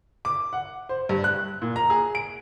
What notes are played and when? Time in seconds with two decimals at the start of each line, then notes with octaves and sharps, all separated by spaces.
0.25 D6
0.53 F#5
0.89 C5
1.09 G2
1.24 F#6
1.62 A#2
1.76 A#5
1.90 G#4
2.15 D7